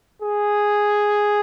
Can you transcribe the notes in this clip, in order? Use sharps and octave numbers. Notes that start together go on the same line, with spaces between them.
G#4